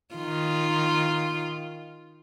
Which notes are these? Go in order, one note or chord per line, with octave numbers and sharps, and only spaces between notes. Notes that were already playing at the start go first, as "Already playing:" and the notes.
D#3 F4